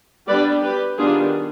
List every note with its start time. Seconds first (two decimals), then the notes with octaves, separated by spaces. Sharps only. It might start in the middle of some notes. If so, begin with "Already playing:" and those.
0.28 G3 B3 D4 B4 D5
0.63 G4 B4
0.98 D#3 G3 B3 D4 F4 G#4